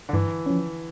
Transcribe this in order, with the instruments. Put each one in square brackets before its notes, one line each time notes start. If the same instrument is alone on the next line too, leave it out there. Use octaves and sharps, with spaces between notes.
[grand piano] D3
[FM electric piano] G2 [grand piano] E3
[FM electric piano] F3 C#4